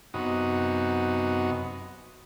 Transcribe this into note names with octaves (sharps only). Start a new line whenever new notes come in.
F#2 C3 B3 D#4 F#4 D#6